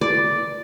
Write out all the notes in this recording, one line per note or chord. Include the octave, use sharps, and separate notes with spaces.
D5